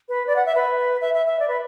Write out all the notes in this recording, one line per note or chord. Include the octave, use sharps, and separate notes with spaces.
B4
D5
F#5
E5
B4
E5
E5
E5
D5
B4